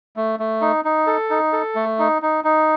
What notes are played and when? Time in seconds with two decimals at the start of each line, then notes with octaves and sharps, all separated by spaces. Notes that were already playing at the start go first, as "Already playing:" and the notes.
0.16 A3
0.40 A3
0.61 D#4
0.85 D#4
1.07 A4
1.30 D#4
1.52 A4
1.75 A3
1.99 D#4
2.22 D#4
2.44 D#4